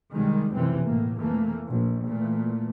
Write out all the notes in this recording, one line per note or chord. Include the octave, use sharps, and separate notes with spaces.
C2 D#3 G3 G#3
F1 B1 F#2 C3 E3 C4
A2 A#3
F2 E3 A3 A#3
A#1
A#2 E3 A3